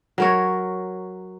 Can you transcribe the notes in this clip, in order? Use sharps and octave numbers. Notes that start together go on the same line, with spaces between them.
F#3 A#4 C#5